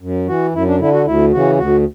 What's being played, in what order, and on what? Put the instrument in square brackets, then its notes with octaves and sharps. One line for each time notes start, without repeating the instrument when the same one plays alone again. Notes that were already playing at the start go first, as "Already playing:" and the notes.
[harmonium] F#2
E3 F#4
F#2 E4
D4
D3 E4
F#4
D2 E4
C#3 E3 F#4
D2 F#4